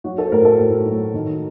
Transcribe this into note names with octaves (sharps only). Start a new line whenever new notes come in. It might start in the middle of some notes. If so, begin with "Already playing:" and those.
F#3 F#4
A4
C5
A2 A#4
A4
A2
F#3
D#3